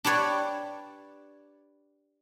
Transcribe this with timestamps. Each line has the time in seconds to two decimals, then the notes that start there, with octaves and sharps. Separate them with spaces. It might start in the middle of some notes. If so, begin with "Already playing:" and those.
0.05 D4 G4 B4 C#5 D5